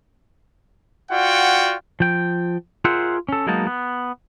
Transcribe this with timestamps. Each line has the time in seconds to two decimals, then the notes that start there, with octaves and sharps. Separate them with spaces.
1.11 F4 F#4 D5 F#5 G5
2.00 F3 G5
2.85 F4 G#4 A#4 C5 E5 F#5
3.29 C#4 A4
3.47 F#3 G#3 A#3 B3 D#4 A5
3.67 B3